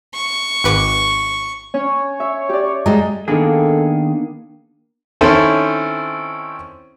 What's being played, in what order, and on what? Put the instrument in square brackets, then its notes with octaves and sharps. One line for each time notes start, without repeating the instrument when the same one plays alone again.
[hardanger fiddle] C#6
[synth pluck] G#1 B4 D6
[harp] C#4 [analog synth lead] C#5
[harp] E5
G4 D5
[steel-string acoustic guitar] G3 G#3 [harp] A#5
[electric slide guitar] D#3 G#4 [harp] A#3 B3 D4 [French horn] A4
[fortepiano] D#3 C4 C#4 E4 A4 C5